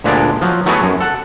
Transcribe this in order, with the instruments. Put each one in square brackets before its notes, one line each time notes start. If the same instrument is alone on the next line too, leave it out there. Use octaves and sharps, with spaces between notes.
[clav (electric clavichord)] D2 A#2 G#3 B3 D4 A4
F3 F#3
F#3 A3 B3 E4 F#4 G#4
F#2
A4 F#5